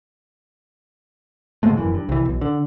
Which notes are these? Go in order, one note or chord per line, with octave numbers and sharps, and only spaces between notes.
G#2 C#3 G#3 A3
E1 F#2 E3
G2
C2 E3
B1
D3